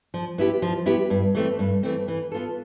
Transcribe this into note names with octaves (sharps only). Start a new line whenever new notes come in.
F3
B3 E4 G4
F3
B3 E4 G4
G2
E3 A3 C4
G2
E3 A3 C4
E3
B3 F4 A4